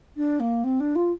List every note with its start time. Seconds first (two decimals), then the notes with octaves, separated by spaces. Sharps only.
0.16 D4
0.40 A#3
0.64 C4
0.80 D4
0.95 F4